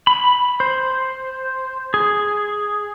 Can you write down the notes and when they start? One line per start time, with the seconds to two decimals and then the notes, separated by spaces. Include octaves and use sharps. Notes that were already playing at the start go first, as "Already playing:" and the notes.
0.07 B5
0.60 C5
1.94 G#4